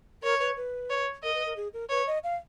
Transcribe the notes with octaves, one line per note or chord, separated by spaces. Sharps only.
A#4 C#5
B4
B4
C#5
A#4 D#5
B4
A#4
G#4
A#4
B4 C#5
D#5
F5